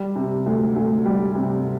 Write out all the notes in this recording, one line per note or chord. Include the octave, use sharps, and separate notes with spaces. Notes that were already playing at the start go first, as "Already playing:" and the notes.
Already playing: G3
C3
D2
D2
G3
C3